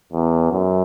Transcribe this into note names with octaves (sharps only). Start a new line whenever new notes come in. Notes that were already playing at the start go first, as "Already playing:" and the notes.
E2
F#2